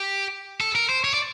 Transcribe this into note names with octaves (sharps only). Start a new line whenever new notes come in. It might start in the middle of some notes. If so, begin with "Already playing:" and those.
Already playing: G4
A4
A#4
C5
C#5
D5